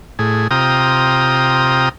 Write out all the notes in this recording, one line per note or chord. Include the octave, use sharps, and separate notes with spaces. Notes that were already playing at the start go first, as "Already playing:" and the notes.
A2 G#4
C3 F4 G5 A#5 D#6